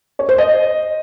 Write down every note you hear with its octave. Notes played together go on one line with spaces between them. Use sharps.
C#5
C5
D#5